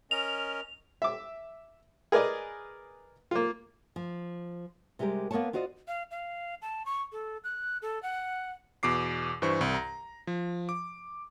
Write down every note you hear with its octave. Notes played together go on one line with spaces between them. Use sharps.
C#4 A#4 D#5 F7
E5 D6
G#4 A#4 B4 D5 D#5
A#3 F4
F3
C3 G3 G#3 G4 A#4
A#3 B3 A#4 B4 C#5 A5
F4 F#4 C5 D5 D#5
F5
F5
A5
C#6
A4
F#6
A4
F#5
E2 B2 D6 C7
G2 E3 C5 C#6
C2
A#5
F3
D6